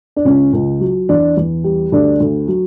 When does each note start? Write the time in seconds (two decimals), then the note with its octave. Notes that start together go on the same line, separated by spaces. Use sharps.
0.16 D4
0.25 C#2 C#4
0.53 C#2
0.81 F#3
1.09 E2 D4
1.37 E2
1.64 G3
1.92 D2 D4
2.20 D2
2.48 F#3